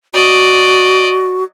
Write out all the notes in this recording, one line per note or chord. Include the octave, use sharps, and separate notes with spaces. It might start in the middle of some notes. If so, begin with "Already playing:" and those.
F#4 D5 D#5